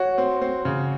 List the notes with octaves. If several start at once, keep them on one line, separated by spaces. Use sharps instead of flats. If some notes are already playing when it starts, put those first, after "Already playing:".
Already playing: F#4 C#5
C4
C4
C#3